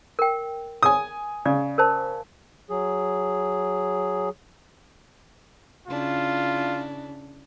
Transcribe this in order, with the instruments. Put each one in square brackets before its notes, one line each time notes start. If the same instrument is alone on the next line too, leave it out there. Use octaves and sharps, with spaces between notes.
[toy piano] A#4 G5
[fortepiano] G#5 D#6
[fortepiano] C#3 [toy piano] D5
[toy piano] A#4 C5 A5
[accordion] F#3 G#4
[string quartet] C#3 D4 E4 [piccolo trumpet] F4